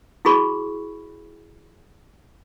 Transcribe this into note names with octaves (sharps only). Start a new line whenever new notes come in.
E4 F#4 G#4 B5 C#6